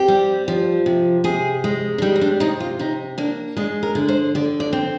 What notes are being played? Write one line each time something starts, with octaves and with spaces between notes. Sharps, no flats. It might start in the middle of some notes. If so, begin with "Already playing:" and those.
Already playing: C4 G4
G3
F3
C3
C3 G#4
G#3
D4
G3 D#4
C4
D4
C3 D#4
F4
C3 D#4
A#3 D4
G#3 D4
A#4
D3
C5
D3 D5
D5
C4